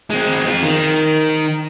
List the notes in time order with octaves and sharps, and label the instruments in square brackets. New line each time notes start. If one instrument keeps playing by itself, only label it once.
[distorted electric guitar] G#3 C4
C4 F4
D#3